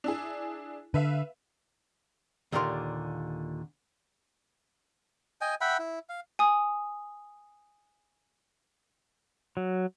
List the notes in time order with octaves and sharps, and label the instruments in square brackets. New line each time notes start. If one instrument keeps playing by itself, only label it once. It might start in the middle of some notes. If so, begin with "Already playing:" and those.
[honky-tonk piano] D4 E4 G#4
[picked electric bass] D3 [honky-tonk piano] B4 E5 F5
[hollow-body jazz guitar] D#2 A#2 D3 G4 A#4 C6
[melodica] D#5 G5 G#5
E5 F#5 G5 B5
E4
F5
[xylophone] G#5 D#6
[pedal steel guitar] F#3